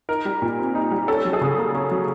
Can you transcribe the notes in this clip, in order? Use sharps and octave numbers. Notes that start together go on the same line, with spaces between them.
D#4 A#4
G3
A#2
C4
D#4
G3
C#4 A4
F#3
G#4
C#3
A#3
C#4
F#3